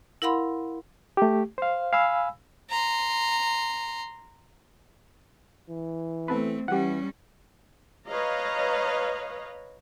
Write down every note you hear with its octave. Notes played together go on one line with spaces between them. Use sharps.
E4 A#4 F5 F#5 B5 C6
A3 G4
C5 F5
F5 G#5 B5 E6
A#5 C6
E3
A3 B3 C4 A4 B4
E3 G3 C#4 G4 F#5
B4 C#5 D#5 F5 A#5